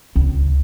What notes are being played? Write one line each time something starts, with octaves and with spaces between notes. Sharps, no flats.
C#2